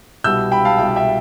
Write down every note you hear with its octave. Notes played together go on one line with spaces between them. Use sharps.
C2 B2 G3 E6 G6
G5 B5
F5 A5
C2 B2 G3 G5
F5
E5 G5